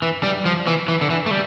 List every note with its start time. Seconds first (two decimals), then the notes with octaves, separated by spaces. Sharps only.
0.02 E3
0.23 G3
0.45 F3
0.67 E3
0.88 E3
1.01 D3
1.10 E3
1.26 A3
1.31 G3